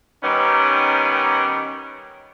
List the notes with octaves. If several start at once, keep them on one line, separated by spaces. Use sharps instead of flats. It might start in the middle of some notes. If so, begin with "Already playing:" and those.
D#3 G3 B3 C#4 D#4